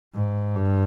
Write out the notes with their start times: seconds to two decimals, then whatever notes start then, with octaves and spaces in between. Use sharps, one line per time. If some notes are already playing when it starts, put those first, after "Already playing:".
0.15 G#2
0.55 G2